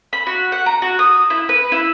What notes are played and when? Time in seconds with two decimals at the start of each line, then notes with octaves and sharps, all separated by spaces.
0.13 B5
0.27 F#4
0.52 F#5
0.66 A#5
0.82 F#4
0.99 D#6
1.30 E4
1.49 B4
1.72 E4